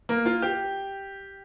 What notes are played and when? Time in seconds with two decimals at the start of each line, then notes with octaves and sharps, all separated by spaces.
0.09 A#3
0.26 F4
0.42 G4